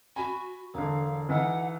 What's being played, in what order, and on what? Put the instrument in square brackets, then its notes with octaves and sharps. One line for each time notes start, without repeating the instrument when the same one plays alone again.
[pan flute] F#4 [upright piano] G#5 B5
[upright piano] E1 D3 [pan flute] F5
[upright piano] B1 E3 [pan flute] F#5